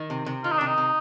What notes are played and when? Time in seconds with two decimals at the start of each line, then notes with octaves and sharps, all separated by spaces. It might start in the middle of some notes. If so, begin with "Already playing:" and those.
Already playing: D#3
0.10 C3
0.26 C3
0.44 D#3 F4
0.51 D#4
0.58 D4
0.61 C3
0.67 D#4
0.78 C3